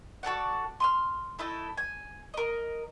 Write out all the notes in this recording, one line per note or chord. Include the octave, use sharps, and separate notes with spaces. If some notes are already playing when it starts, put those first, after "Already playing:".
F#4 A4 D5 F#5
C6 D#6 F6
A3 E4 A4 D#5
G#5
A#4 D#5